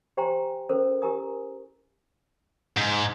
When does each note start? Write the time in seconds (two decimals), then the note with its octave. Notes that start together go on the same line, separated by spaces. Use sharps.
0.17 G4 C5 G5 G#5 A#5 C6
0.69 C#4 A4 A#4 C5
1.02 E4 G4 A#4 G#5 A#5 D#6
2.77 G#2